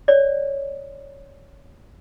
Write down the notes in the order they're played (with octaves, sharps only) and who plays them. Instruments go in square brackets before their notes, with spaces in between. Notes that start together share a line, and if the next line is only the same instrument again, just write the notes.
[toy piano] C#5 D5